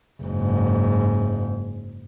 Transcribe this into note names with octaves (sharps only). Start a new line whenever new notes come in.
F#1 G#2